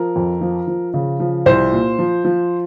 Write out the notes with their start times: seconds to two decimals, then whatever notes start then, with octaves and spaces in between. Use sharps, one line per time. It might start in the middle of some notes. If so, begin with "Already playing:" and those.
Already playing: F3 A#4
0.16 F2
0.41 F3
0.67 F3
0.94 C#3
1.20 F3
1.46 C2 C5
1.72 A#2
1.99 F3
2.25 F3